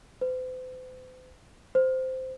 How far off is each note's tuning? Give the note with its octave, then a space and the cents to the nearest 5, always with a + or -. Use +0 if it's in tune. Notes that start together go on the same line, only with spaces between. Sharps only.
C5 -45
C5 -10